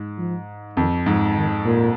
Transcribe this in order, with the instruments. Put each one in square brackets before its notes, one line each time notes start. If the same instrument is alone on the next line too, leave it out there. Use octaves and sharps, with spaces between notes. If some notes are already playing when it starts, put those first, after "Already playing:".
Already playing: [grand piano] G#2
[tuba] F3
[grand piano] F2 [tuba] D#3
[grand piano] G#2 [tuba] F3
[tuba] D#3
A#2